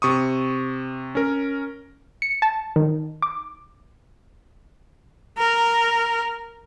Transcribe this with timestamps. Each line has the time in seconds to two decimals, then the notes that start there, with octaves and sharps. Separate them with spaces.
0.02 C3 C#6 D#6
1.15 C#4 A#4
2.22 C#7
2.42 A5
2.76 D#3
3.22 D6
5.38 A#4